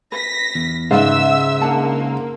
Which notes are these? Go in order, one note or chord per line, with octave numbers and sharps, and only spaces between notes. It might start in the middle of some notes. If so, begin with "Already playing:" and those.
B4 A#6 B6
E2
G#2 C#3 B4 D5 E5 F5 E6
A#3 D4 F#5 A5
F4